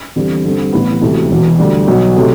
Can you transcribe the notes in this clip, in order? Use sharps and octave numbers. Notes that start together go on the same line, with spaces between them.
E2 D3 G3 C4 G4
G2 D3 G3 C4
A1 A2 E3 B3
E1 D2 C3 E3 A3
E1 E2 B2
D2 D3 G3
B1 B2 F#3
C3 F#3 A3